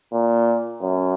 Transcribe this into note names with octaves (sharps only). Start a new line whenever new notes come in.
A#2
F#2